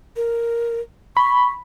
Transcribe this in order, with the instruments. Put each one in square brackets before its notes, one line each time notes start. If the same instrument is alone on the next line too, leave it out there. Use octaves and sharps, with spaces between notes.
[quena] A#4
[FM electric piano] B5 [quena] C#6